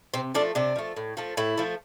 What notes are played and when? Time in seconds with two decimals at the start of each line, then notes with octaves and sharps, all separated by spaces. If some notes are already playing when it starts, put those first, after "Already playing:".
0.14 C3 C4
0.34 F3 A3 D4
0.55 C3 D4
0.76 F3 A3
0.97 A2
1.17 F3 A3
1.37 A2 E4
1.58 F3 A3